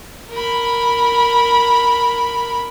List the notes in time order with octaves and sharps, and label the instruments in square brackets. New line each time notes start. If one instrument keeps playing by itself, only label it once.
[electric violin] A#4 B5